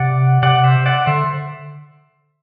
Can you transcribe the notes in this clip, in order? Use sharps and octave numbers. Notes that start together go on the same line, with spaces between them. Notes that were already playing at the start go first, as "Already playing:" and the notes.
Already playing: C3 D5 F#5
C3 D5 F#5
C5 E5
D5 F#5
D3 C5 E5